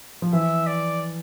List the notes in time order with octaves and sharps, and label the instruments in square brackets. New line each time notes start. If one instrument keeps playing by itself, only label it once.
[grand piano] F3
[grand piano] E3 [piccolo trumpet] E5
[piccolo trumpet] D5